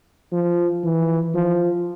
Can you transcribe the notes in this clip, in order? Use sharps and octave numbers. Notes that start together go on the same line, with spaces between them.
F3
E3
F3